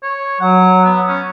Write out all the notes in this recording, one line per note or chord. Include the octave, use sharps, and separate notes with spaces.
C#5
F#3 F#5
B3
C#4